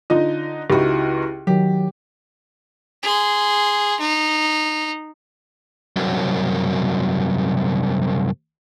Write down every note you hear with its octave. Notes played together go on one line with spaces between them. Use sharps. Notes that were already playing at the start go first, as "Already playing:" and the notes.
D3 D#4 F4 D#5
C#2 D#4 E4 F#4 G4
D#3 F#3 G4
G#4 C6
D#4
C2 F#2